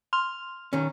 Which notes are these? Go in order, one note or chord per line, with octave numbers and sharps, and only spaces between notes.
C6 F6 F7
D#3 C#4